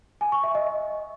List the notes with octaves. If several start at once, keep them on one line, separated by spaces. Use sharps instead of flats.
G#5
C#6
E5
D#5